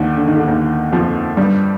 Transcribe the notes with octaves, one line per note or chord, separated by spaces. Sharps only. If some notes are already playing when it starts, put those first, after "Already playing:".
Already playing: D#2 D3 D#3
D3
D#3
D3
D#2 D#3
F2 F3
G2 G3